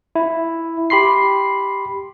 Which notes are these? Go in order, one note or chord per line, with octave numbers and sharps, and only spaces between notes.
E4
G4 B5 C6 C7